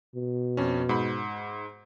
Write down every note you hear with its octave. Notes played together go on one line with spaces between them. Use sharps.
B2
F2 C#4
G#2 B5